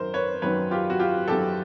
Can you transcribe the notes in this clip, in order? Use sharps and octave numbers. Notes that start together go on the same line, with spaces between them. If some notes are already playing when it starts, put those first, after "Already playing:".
Already playing: F#2 D#3 F#3 A#4 C5
B4 C#5
F#2 D#3 F#3 B4 C#5
F4 G4
F#4
F4 G4
F#2 D#3 F#3 G4 A4